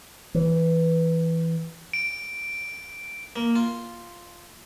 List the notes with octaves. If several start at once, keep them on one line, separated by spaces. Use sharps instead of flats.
E3
D7
A#3
F4